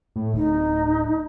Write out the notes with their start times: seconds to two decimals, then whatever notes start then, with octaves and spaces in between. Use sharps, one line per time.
0.16 A2
0.34 D1 D#4